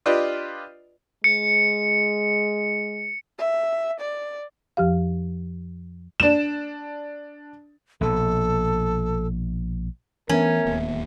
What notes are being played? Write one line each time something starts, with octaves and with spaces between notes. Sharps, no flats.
D4 F4 G4 B4 D5 D#5
G#3 C#7
E5
D5
F2 F3 G4 F5
D4 E7
A#1 B2 A4
E3 A3 B3 C#4 A#4 F#5
D1 D#2 A#3